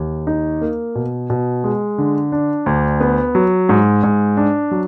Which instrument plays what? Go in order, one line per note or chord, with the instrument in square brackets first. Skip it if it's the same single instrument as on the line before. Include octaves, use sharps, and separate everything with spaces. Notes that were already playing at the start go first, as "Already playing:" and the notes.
Already playing: [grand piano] D#2
D#4
A#3
B2
B2
G#3
D3
D4
D2
B3
F#3
G#2
G#2
D4
F#3